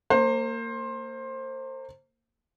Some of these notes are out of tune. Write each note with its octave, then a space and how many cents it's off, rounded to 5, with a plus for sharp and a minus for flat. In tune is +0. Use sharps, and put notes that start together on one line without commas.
A#3 -25 C5 +20